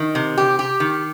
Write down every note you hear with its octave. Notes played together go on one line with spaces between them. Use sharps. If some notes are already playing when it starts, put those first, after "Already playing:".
Already playing: D#3
C3
G4
G4
D#3